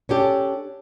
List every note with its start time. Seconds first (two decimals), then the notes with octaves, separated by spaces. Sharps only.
0.09 C#4 D4 G4 A4